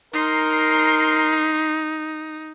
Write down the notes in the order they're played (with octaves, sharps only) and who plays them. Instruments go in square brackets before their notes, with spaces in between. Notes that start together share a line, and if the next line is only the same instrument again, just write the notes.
[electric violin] D#4 [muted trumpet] A#4 [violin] C6 C7